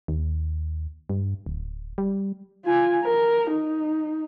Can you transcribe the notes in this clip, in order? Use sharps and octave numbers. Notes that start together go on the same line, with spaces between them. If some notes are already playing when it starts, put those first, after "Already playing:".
D#2
G2
D1
G3
F4 G#5
A#4
D#4